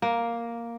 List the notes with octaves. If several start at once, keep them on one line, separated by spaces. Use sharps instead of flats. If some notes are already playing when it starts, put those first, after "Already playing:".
A#3